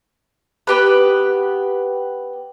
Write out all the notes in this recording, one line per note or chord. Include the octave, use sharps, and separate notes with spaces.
B3 G4 B4